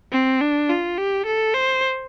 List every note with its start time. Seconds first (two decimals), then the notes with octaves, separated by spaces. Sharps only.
0.12 C4
0.41 D4
0.70 F4
0.98 G4
1.26 A4
1.55 C5